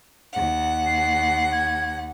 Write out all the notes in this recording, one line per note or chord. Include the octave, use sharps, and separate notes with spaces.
D#2 F#5
C7
G#6